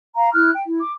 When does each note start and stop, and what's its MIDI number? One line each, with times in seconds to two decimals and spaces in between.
0.14 0.32 77
0.14 0.32 82
0.33 0.50 64
0.33 0.50 89
0.33 0.50 90
0.53 0.61 79
0.66 0.79 64
0.80 0.91 86